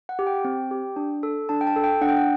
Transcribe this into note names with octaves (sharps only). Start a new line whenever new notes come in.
F#5
G4
G5
C4
G4
D4
A4
D4 A5
G5
A5
A4
G5
D4 F#5
G5
F#5